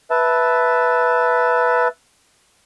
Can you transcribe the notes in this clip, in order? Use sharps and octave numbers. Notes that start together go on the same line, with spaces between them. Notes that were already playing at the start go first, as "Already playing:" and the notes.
B4 E5 A5